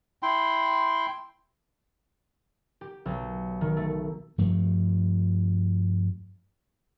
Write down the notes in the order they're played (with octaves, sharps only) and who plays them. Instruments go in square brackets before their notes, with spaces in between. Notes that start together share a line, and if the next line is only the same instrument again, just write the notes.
[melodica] E4 G5 C6
[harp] G4
B1
D#3
A3
[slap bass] G2 F3 G3 A3